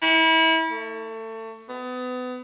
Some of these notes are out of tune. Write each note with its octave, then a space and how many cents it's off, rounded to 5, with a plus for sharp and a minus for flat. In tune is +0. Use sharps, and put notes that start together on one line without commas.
E4 -30
A3 +25
B3 +30